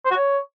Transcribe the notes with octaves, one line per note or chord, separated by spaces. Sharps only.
C5
F#4
C#5